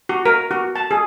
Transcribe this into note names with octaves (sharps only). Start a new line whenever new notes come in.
F#4
A#4
F#4
A5
G#4